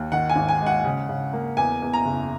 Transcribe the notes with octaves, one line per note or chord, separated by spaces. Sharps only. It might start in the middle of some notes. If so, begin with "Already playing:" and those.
Already playing: D#2
D#3 F#5
G#5
G#1
G#5
G#3
F#5
C#3
C#3
A#3
E2 G#5
E2
A#5
F#1